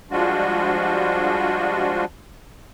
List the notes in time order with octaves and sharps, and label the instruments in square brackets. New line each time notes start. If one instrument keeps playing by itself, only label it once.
[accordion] F3 G3 G#3 D4 F4 F#4